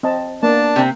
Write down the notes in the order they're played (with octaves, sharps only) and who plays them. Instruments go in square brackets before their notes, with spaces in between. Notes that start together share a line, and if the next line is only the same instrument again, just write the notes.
[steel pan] C4 D#5 A5
[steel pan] A#3 B3 [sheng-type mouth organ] D4 A5
[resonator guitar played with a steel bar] C3 C4